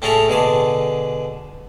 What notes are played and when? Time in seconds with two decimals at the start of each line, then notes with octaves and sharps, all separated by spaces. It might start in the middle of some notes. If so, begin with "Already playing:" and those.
0.02 A2 C#4 E4 G#4 A4 A#5
0.28 B2 D3 G#4 D6